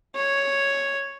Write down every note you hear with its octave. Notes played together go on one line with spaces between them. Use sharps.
C#5